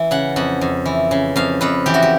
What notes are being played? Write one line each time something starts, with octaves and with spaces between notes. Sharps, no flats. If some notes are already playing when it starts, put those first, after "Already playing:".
Already playing: E3
C#3 F#5
F2 F#5
F2
E3
C#3
F2 F5
F2 B4
E3 G4
F#4
G4